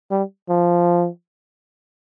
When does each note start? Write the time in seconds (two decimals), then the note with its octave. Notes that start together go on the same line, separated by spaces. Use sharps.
0.11 G3
0.49 F3